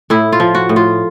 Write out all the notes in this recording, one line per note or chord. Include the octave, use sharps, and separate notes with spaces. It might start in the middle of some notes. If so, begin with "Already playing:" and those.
A2 E4
F4
F3
F#4
A2
F4